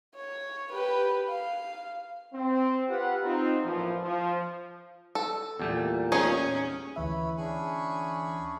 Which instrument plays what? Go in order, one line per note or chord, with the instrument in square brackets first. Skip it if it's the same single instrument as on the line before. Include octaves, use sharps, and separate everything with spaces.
[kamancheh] C#5
G4 B4
F5
[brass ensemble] C4
F4 G4 B4 F#5
C4 D#4 F4
A1 F#2 A#2 E3 F3
F3
[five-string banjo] A4
[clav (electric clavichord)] E2 G3 A3 [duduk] A#2
[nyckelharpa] C#4 [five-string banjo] D#4 G#4 C#5
[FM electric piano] D2 E3 E5 [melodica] B4 C#5 B5
[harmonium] C#4 D4 G#4 [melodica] G#5 B5 C#6